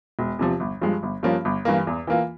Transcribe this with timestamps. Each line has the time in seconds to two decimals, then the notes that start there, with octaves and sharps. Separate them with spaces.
0.19 E1
0.39 E2 C3 F3
0.60 G1
0.81 G2 F3 G#3
1.03 G1
1.23 G2 F3 A#3 C#4
1.45 G1
1.65 G2 E3 A#3
1.87 E2
2.07 E3 A#3 F4